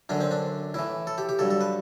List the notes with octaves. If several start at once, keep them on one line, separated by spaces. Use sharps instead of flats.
F#2 D3 F#3 D4
C4
D4
A2 E3 E4
A4
G4
G4
G2 F#3 A4
A4
B4